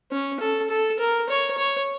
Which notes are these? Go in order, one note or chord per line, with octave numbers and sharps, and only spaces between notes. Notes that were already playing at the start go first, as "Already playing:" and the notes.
C#4
A4
A4
A#4
C#5
C#5